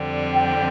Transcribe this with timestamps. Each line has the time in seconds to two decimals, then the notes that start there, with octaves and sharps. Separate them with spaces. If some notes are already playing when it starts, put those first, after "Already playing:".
Already playing: F2 D3 G3 C4
0.35 G5